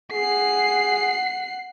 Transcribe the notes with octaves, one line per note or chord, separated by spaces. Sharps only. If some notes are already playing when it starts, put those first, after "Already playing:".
G#4 F#5 C7